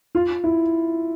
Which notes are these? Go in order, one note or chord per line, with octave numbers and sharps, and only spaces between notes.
F4
E4